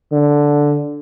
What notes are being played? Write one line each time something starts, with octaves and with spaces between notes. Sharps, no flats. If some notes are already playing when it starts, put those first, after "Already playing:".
D3